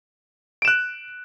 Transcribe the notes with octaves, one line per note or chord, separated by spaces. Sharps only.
F#6 D7 E7